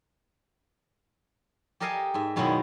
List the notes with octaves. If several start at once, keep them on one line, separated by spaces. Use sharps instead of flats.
G4 A4 A#4 D#5 F5 G#5
G#2 E5
F#2 B2 D#3 F#3 G#3 E4